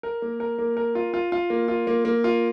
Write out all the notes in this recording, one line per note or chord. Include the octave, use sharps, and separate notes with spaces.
A#4
A#3
A#4
A#3
A#4
F4
F4
F4
A#3
F4
A#3
A#3
F4